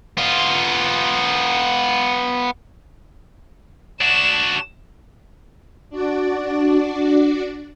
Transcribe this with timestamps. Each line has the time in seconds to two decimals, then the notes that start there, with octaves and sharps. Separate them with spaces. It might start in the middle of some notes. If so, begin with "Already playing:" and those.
0.17 B3 F4
4.01 D4 F#4 E7
5.90 D4 F#4 D5